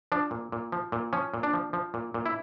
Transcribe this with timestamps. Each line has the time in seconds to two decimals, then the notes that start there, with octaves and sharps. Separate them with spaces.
0.12 F3 D4
0.31 A#2
0.52 A#2
0.72 F3
0.92 A#2
1.13 F3 C#4
1.34 A#2
1.43 D4
1.53 F3
1.73 F3
1.94 A#2
2.14 A#2
2.26 E4